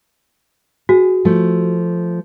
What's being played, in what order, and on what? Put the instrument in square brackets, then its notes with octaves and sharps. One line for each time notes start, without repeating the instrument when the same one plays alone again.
[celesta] F#4 [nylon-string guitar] G#4
[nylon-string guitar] F3 A3